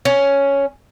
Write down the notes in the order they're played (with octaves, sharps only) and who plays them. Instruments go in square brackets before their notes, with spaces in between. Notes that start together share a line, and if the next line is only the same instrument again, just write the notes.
[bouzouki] C#4